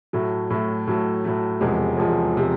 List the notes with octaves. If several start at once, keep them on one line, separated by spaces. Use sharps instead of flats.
A2 F#3 A3
A2 F#3 A3
A2 F#3 A3
A2 F#3 A3
E1 E2 C3 F3 G#3
E1 E2 C3 F3 G#3
C3 F3 G#3